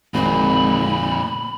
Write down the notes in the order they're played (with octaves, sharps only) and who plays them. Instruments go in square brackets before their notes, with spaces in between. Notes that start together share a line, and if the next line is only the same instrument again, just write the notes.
[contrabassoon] G#1 [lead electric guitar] F2 A#2 [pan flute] B5